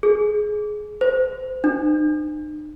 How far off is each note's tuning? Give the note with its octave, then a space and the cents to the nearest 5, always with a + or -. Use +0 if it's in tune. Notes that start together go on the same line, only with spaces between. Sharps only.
G#4 +20
C5 -25
D#4 -45